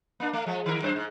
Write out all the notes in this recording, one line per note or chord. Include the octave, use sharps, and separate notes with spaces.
A#3 D4
A3
F3 G#3
D#3 A#4
F#2 B4 C5
G#2